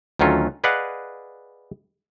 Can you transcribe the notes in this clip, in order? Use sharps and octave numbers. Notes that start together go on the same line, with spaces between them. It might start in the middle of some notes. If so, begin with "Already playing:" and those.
D2 D#3 F#3 C#4 F4 A4
G#4 B4 D5 D#5 F5 F#5